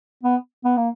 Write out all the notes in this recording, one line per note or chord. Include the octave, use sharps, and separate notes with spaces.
B3
B3
A#3